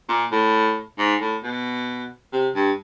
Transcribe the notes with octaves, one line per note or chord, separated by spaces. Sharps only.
A#2
A2
G#2
A2
B2
C3
G2